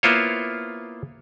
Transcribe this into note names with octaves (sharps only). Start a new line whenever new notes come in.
A#3 B3 E4 F4 C5 C#5